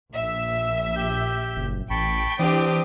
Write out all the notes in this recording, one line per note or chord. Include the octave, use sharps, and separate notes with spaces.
A#1 E5
G4 G6
F#1
A1 G5 A5 B5 C#6
E3 C4 D4 G4 D6 D#6